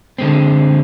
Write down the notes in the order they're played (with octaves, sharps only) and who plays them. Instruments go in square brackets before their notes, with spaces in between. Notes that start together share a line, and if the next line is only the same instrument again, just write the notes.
[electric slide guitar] D3 G#3 C4